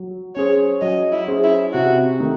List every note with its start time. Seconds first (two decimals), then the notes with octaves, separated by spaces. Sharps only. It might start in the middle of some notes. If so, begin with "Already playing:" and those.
Already playing: F#3
0.35 C#4 G#4 C5 C#5
0.81 F#3 D#5
1.12 E4
1.28 C#4 G#4 C5
1.44 E4
1.74 C3 F#4
2.20 D#3 A3 D#4